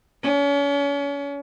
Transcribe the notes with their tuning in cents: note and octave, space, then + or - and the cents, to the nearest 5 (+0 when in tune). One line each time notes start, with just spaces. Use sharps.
C#4 +35